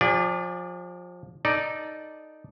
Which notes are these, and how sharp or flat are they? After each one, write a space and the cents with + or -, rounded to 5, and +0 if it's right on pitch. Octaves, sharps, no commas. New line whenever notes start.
F3 +30 G#4 -40 D5 +0
D#4 -5 A4 -10 D5 +5